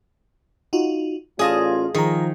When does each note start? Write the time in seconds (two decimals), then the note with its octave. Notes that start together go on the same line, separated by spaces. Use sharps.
0.73 D#4 F4 F#4
1.39 A1 C#4 F4 G#4 D5 D#5 F5 A5
1.95 D#3 F3 G#4 A#5